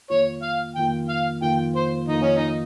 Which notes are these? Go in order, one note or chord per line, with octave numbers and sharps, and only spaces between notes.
F2 D#3 A#3 F4 C#5
F5
F2 D#3 A#3 F4 G5
F5
F2 D#3 A#3 F4 G5
C5
F2 D#3 A#3 D#4 F4
C#4
D#4